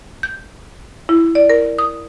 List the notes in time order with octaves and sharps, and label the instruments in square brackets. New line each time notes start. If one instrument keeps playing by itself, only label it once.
[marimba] G6
E4
D5
A#4
D#6